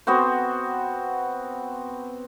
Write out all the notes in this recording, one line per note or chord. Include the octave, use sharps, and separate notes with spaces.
B3 C4 F#4 C5